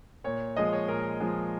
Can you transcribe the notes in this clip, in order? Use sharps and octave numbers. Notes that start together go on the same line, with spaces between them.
A#2 C#5
F3 G#3 D#5
C#5
A#2 A#4
F3 G#3